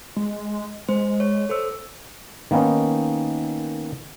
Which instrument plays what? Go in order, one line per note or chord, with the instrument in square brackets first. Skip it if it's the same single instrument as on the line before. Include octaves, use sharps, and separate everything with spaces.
[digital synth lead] G#3
[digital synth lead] G#3 [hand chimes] C5
[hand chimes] C#5
A4 C5 E6
[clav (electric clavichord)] D#3 A#3 B3 C#4 D#4